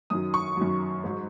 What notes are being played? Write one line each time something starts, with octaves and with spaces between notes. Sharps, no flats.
F#2 D#3 F#3 D#6
C#6
F#2 D#3 F#3
G#2 F#3